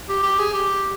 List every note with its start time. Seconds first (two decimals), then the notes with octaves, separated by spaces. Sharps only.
0.09 G4
0.23 G4
0.39 G#4
0.54 G4